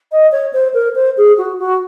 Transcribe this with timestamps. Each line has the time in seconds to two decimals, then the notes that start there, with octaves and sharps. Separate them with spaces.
0.12 D#5
0.32 C#5
0.53 C5
0.74 A#4
0.95 C5
1.17 G#4
1.38 F#4
1.59 F#4